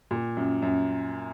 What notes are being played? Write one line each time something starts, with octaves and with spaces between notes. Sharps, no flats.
A#2
F#2
F#2